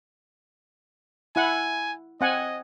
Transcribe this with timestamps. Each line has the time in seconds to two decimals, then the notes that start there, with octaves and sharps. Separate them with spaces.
1.36 E4 F#5 G#5
2.21 C4 D#5 F#5 G#5